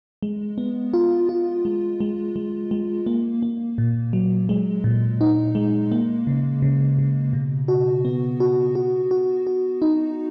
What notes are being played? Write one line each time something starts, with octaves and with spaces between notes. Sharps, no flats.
G#3
B3
F4
F4
G#3
G#3
G#3
G#3
A#3
A#3
A#2
F#3
G#3
A#2
D#4
G#3
A#3
C#3
C#3
C#3
B2
F#4
B3
F#4
F#4
F#4
F#4
D#4